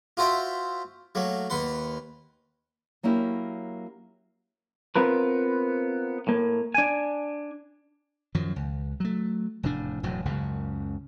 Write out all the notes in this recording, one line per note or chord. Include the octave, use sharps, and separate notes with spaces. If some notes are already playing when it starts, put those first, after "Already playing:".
F4 F#4 C5 E5 G5
F#3 A3 A#3
D#2 B4 F#5 C6
F#3 A#3 C#4 E4 G4
B3 C4 F4 A#4 B4
A2 A#3
D4 G#5
F#2 D#3 F3 F#3
C#2
F#3 A3
F1 E2 A2 D4
E1 A2 F#3
F#1 C#2 F#2 C#3